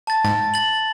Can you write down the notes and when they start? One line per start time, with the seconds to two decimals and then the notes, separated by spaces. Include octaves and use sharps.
0.07 A5 A6
0.25 G#2 A6
0.54 A6 F#7